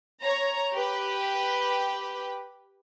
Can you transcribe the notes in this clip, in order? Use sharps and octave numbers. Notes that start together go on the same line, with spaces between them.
C#5 A#5
G4 B4